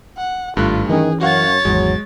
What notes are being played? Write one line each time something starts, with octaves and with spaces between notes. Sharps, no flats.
F#5
G#1 G2 A3 F4 F#6
D#3 E3 C4 C#4 G#4
F#2 F#4 C#5 F5 F#5 A6
G#1 E2 F#3 G#3